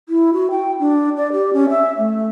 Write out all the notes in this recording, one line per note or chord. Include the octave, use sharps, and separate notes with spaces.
E4
F#4
G5
D4
D5
G4
C#4
E5
A3